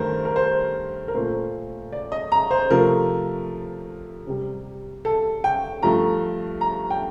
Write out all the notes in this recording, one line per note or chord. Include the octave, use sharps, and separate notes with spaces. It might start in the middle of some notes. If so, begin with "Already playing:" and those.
Already playing: G2 D#3 A3 A#4 C5
A#4
C5
A#4
A#2 A3 C5
D5
D#5
A#5
C5
C3 F3 A3 A#4
C3 G3
A4
G5
G2 F3 A3 A#5
A#5
G5